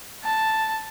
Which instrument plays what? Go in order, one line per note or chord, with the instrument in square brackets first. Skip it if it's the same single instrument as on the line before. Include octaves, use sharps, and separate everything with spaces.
[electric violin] A5